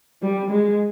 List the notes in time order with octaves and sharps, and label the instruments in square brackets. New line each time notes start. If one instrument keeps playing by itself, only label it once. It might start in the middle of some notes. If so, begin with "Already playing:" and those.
[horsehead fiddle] G3
G#3